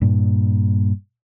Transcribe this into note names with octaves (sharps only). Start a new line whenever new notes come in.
G2 A#2